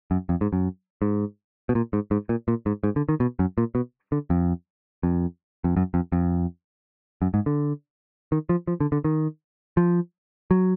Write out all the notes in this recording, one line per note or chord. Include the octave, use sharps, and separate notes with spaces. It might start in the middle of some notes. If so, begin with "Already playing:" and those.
F#2
F2
G#2
F#2
G#2
B2
A#2
G#2
G#2
A#2
A#2
G#2
G#2
D3
D#3
B2
F#2
A#2
B2
D3
F2
F2
F2
F#2
F2
F2
F#2
G#2
D3
D#3
F3
F3
D3
D3
D#3
F3
F#3